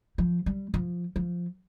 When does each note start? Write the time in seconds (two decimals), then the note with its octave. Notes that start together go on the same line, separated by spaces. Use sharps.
0.18 F3
0.46 G3
0.74 F3
1.16 F3